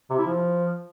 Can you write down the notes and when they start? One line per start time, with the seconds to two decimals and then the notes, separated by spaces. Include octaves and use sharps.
0.10 C3
0.19 E4
0.27 F3